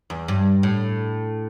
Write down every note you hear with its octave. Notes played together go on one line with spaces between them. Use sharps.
E2
G2
A2